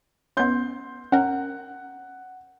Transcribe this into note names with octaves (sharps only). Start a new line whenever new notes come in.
B3 C#4 C6 G6
C#4 A#4 F#5